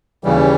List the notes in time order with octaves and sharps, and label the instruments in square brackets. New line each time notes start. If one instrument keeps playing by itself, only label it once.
[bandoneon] D#2 C#3 E3 G3